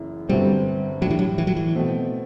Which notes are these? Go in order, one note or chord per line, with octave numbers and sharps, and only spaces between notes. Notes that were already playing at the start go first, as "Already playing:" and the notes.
Already playing: F#1 F#2 E3 E4
G1 G2 D3 F#3 G3 C4
A2 F#3 G3 D4
E3
F#3
E3
F#3
E3
B2 A3 C4